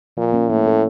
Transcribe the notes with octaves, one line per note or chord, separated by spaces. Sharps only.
A#2 F3
A#3 C#4
A2 A#3
C#4 E4 A4 C#5